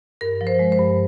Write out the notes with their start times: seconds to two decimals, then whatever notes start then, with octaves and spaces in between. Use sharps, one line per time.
0.21 G2 A#4
0.41 F3
0.47 C5
0.59 G#3
0.72 C5
0.79 G2